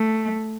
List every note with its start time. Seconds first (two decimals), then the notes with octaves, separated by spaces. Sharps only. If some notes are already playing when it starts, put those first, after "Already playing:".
Already playing: A3